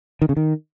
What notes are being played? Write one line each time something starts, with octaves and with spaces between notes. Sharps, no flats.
D#3
C#3
D#3